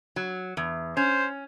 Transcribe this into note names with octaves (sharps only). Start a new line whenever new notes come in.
F#3
E2
C#4 C5